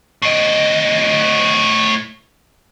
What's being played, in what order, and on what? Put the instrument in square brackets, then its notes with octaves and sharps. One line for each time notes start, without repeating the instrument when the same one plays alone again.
[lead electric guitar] A2 D#5